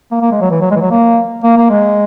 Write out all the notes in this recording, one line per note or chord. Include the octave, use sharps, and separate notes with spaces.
A#3
A#3
G#3
F#3
E3
F#3
G#3
E3
F#3
A#3
A#3
A#3
G#3